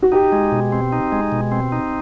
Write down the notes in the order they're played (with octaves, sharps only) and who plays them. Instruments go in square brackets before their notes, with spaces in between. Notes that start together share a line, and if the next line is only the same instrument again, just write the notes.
[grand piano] F#4
[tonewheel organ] D#4 [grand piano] G4
[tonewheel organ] G#3
B2
C4
D#4
G#3
B2
C4
D#4